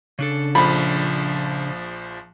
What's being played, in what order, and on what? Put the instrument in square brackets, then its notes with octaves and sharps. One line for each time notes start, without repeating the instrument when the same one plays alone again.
[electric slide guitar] C#3 D4 A4
[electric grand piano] A#1 F3 [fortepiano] B5